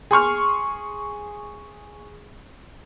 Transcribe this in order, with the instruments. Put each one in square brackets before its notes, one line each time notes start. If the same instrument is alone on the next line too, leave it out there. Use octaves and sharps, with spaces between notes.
[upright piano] G#4 C6 C#6 F6